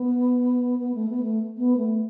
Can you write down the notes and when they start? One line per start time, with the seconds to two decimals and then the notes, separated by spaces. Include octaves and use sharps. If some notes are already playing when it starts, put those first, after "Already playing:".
Already playing: B3
0.79 B3
0.95 A3
1.09 B3
1.23 A3
1.58 B3
1.77 A3